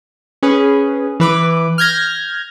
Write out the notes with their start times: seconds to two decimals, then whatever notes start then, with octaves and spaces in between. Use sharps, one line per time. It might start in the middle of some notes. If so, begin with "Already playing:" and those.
0.43 C#4 G#4 B4
1.20 E3 B4 D6
1.78 F6 G6 G#6 A#6